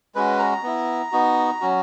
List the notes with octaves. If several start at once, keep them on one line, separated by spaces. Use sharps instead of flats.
G#3 C#4 F#4 B4
A#5
B3 E4
B3 D#4 F#4
F#3 C#4 F#4